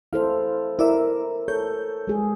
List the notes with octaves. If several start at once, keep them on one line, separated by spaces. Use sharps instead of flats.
E4 A4 C5 F5
E4 A#4 D5 E5
A4 C#5 G6
G#3 G#4